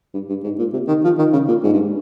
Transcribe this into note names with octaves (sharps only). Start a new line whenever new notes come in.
G2
G2
G#2
A#2
C3
D#3
F3
D#3
C#3
A#2
G#2
G2